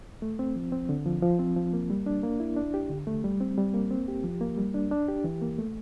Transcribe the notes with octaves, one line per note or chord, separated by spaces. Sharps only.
A3
C4
F3
C4
D3
F3
F3
C4
F3
A#3
G3
D4
A#3
E4
D4
G4
D3
A3
G3
C4
G3
A#3
C4
G4
F3
A#3
G3
D4
D4
G4
E3
A#3
A3